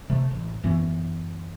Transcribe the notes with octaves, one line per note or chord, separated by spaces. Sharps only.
C3 A3
A1
F#2 E3 B3 C#4